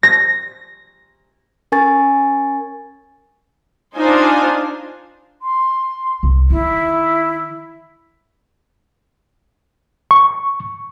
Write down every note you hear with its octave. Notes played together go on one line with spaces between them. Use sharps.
A#6
C#4 A#4 G#5 C#6 A6
D4 D#4 F4 C5 G#5
C6
C2
D#3 E4
C#6